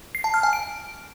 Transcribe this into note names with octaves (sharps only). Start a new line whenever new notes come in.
C7
A5
F6
G#5
D7